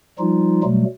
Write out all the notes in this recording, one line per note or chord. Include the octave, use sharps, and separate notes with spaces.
F3 G3 D#4 F4
B2 F#3 G3 A3